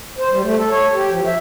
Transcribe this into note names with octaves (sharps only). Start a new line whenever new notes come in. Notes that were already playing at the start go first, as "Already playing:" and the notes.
C5
G3
A3
A4
C#5
G4
F3
E5